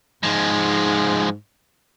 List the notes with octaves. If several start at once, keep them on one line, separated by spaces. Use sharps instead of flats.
G#2 F3 G#3